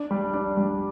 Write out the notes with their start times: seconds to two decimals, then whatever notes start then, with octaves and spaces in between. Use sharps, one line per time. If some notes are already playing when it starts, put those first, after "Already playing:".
Already playing: D4
0.11 G3
0.34 D4
0.57 G3